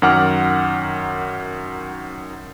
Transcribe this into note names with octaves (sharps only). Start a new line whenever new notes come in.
F#2 D#3 F#5 D6 F6